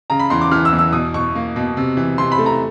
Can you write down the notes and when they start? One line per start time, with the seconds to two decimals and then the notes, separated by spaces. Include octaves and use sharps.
0.10 C#3 A#5
0.19 B5
0.30 E2 C6
0.41 D6
0.51 E3 F6
0.65 E6
0.73 E2
0.79 E6
0.92 B2 D#6
1.14 B2 C#6
1.35 A#3
1.56 B2
1.77 C3
1.97 E3
2.18 C3 C6
2.32 B5
2.38 A3
2.46 A#5